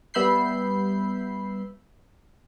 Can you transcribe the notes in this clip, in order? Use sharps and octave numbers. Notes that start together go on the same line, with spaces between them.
G3 B3 E5 B5 G6 C7